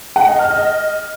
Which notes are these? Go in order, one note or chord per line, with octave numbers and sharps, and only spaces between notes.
F#5
D#5
F6
D#5